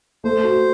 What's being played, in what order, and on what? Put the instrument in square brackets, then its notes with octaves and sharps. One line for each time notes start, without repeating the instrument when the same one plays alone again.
[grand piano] A3 [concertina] C5
[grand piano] F#4